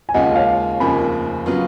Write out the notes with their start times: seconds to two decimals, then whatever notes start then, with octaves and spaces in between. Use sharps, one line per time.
0.09 G#5
0.14 D#2 C#3 G#3 C#4 F4 D#5 F#5
0.36 C#5 F5
0.80 F1 D#2 C#3 F3 A#3 G#5 B5
1.46 C#3 F#3 B3 F4